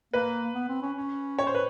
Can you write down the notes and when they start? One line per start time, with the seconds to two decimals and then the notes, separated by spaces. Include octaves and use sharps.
0.13 A#3 B4
0.55 B3
0.69 C4
0.82 C#4
0.97 C#4
1.39 C#5
1.47 C5
1.55 B4